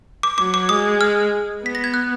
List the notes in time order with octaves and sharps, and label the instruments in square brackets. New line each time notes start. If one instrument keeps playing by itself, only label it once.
[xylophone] D6
[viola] F#3 [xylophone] D6
[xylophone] D6
[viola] G#3 [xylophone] D#6
[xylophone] F6
[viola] B3 [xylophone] B6
[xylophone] A#6
G#6
F#6